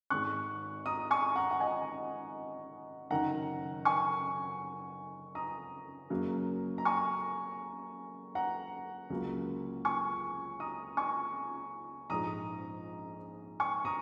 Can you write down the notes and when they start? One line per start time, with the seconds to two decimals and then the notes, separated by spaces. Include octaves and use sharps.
0.10 G#1 G#2 G#3 C#6 F#6
0.86 A#5 D#6
1.11 G#5 C#6
1.36 F#5 A#5
1.51 F#5
1.60 D#5 G#5
3.11 F#1 F#2 D#3 F#5 A#5
3.85 G#5 C#6
5.35 A#5 D#6
6.10 F#2 C#3 F#3 A#3
6.78 A#5
6.85 G#5 C#6
8.35 F#5 A#5
9.10 C#2 C#3 F#3 A#3
9.85 G#5 C#6
10.60 A#5 D#6
10.97 G#5 C#6
12.10 A#1 G#2 G#3 A#5 D#6
13.60 G#5 C#6
13.85 A#5 D#6